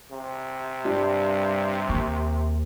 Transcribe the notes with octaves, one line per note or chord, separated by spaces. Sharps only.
C3
G2 G3 D4
D#2 C#6